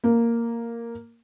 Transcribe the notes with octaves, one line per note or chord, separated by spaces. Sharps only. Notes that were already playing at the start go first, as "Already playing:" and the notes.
A#3